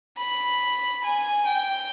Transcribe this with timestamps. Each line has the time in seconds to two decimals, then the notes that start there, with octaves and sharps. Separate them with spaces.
0.18 B5
1.04 G#5
1.47 G5